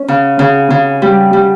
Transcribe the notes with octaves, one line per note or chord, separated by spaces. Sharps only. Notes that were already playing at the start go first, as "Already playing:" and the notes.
Already playing: C#4
C#3
C#3
C#3
G3
G3